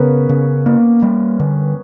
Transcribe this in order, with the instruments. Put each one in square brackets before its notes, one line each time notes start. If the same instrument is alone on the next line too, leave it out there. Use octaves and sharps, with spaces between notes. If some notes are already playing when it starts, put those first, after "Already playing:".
Already playing: [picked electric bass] C#3 [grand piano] B3 C#4 A#4 B4 C#5
[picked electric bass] C#3
A#3
G3
D3